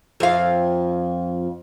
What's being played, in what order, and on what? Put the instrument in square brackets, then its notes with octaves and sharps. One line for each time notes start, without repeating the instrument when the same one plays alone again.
[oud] F2 F5